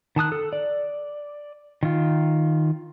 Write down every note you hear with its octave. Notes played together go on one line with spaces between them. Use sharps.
D#3 A5 D#6 F#6
A4
D5
D#3 F4